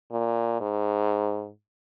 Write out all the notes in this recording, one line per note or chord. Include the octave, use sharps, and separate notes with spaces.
A#2
G#2